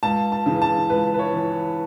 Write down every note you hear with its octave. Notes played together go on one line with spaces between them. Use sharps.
C#2 A5
A5
C#3 E3
A5
C#2 B4
B4
C#5
E3